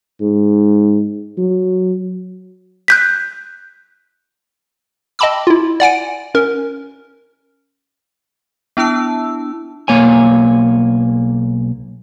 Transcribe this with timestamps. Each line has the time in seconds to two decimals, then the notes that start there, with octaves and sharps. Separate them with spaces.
0.21 G#2
1.38 F#3
2.88 F#6 G6 B6
5.19 D#5 G5 A5 B5 D6 E6
5.47 E4 F4
5.80 D5 F#5 G#5 D7
6.35 C#4 A#4
8.77 B3 D4 E4 A5 E6
9.88 B1 A#3 C#5 G#5